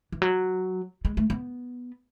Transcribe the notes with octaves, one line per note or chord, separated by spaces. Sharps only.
E3
F#3
G#3
A3
B3